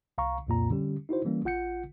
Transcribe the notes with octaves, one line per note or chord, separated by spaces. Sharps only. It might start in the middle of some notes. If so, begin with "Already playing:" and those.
C2 F5 A#5 C#6
C2 F2 A#2 A#5
D3 G3 C#4 G4
D#4 E4 F#4 C5
E3 G3 A#3 C#4
A1 F4 F#5 G6 C#7